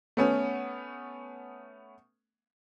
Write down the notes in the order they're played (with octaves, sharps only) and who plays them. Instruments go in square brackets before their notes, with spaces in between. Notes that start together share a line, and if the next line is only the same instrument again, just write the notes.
[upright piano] A3 B3 C#4